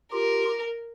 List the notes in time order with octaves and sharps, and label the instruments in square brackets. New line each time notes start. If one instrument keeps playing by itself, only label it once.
[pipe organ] F4 G4 [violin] A#4